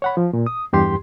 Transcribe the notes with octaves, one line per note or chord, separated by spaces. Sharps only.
C#5 F#5 B5
F3
A#2
D#6
E2 G2 G4 C6